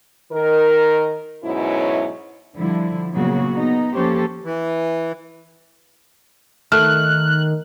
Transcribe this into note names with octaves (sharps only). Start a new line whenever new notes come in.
D#3 A#4
G#2 B2 F#3 C#4 E4
D3 F3 G3 E4
A#2 C#3 F#3 A#3 B3 F#4
B3 D#4
F3 A#3 C#4 G4 A4 C5
E3
D#3 A3 F6 F#6